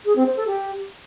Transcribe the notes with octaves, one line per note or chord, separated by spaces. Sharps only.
G#4
C4
C5
A4
G4